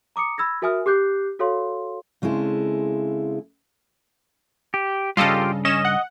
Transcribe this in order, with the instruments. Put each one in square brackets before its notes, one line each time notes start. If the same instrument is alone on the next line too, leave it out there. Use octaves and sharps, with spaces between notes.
[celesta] A#5 D6 D#6 C#7
B5 E6 G#6 A#6
F#4 A#4 E5 G#5 D#6 F6
G4 D6 F#6 G6 C7
F#4 A4 C#5 F5 C6
[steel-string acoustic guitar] C#3 G#3 C4 E4 A4
[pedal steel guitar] G4
[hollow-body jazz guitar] G2 C#3 [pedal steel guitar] F4 G4 [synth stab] A4 D#5 F5
[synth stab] C#4 E7 [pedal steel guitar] D#5
[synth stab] F#5